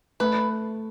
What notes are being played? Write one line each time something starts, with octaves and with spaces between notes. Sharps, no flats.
A3 B4